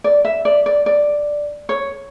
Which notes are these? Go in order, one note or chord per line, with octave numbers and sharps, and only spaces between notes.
D5
E5
D5
D5
D5
C#5